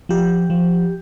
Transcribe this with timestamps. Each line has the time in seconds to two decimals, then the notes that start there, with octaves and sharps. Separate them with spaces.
0.09 F3 G4
0.50 F3